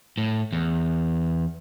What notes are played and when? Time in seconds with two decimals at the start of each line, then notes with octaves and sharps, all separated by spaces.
0.18 A2
0.53 E2